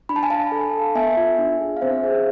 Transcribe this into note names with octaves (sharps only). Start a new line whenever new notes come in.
D4 B5
A5
G#5
D4 F5 A5
A4
A4
B3 E5 G#5
F4
D4
G#4
F5
C4 C5 E5
G#4